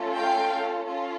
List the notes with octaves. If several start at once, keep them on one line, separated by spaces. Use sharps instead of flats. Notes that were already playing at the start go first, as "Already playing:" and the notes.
Already playing: A3 C#4 F4 A4
F5 G5
C#4 F4 A4